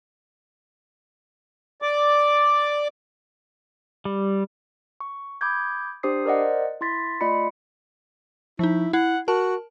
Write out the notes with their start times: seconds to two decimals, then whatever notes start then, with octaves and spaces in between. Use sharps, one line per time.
1.82 D5 D6
4.05 G3
5.00 C#6
5.41 B5 D6 D#6 G6 G#6
6.03 D4 G4 C5 D#6 C7
6.25 A#4 C5 D5 D#5 F#5
6.81 E4 C6 A6 B6
7.21 A3 F4 D5 D#5 B5 C#7
8.59 F3 D#4 E4
8.93 E4 F#5
9.28 F#4 A#4 A5